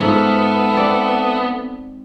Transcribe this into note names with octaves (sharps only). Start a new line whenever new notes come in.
G#2 B3 F4 A4 E5
C4 D5